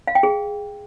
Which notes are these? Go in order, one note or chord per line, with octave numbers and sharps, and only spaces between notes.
F5
G5
G#4